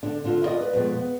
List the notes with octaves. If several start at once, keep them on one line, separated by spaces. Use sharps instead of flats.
D3 D4
D3 C4 F4
E4 F4 A#4 D5 D#5
B4
F2 B2 G#3
B3